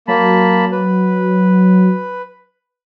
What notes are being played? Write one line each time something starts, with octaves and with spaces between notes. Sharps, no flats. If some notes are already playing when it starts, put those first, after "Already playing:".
F#3 A#3 A5 B5
B4